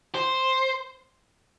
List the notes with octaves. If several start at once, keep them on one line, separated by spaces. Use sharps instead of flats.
C5